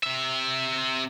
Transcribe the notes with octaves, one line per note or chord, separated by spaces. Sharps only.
C3 E5